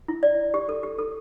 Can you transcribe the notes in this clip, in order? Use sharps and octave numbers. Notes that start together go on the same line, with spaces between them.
E4
D5
G4
A4
G4
A4